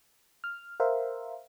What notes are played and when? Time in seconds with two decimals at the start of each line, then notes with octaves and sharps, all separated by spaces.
0.44 F6
0.80 A#4 C5 E5 F5